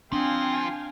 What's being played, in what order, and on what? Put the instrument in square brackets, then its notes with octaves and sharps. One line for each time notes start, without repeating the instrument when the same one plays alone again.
[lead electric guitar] F3 [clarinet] C4 [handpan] D4 [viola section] F5 G5 G#5